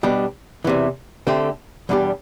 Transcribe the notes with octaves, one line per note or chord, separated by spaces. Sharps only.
B2 G3 D4 G4
E2 C3 E3
D3 A3 C4 G4
E2 B2 G3 D4 G4